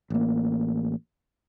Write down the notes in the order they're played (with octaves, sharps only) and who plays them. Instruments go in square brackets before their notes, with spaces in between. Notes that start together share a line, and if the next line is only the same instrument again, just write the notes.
[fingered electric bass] A1 A#3